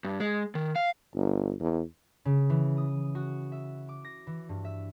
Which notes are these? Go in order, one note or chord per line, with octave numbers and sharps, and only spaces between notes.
G2
G#3
D#3
F5
G1
E2
C#3
E3
D#6
F#4
E5
D6
A#6
E3
G2
E5